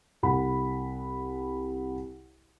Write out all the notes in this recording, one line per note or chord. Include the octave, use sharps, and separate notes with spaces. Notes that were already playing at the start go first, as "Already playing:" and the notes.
C2 F#5 B5